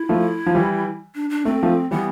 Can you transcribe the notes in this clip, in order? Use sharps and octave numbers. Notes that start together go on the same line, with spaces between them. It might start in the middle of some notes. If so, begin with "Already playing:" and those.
Already playing: E4
F3 A3
F3
E3 G3
D4
D4
A3 C4
F3 A3
E3 G3 B3